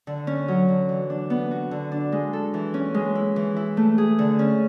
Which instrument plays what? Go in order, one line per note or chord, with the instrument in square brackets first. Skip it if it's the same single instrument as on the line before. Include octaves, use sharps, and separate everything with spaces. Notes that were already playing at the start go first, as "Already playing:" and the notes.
[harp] D3
C#4
F#3
D3
E3
D4
B3
F#4
D3
D4
G#3
A4
E3
C#4
G#3
E4
E3
E4
A3
G#4
D3
C#4